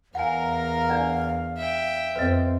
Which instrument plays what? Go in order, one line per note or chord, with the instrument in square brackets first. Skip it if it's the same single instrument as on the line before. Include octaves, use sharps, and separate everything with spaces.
[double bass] E2 [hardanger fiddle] A#4 A#5 [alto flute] F5 [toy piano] F#5 G#5
[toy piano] D4 D5 F#5
[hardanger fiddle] E5 G5
[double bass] F2 C4 [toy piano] B4 D#5